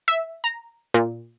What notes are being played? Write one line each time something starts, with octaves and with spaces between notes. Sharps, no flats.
E5
A#5
A#2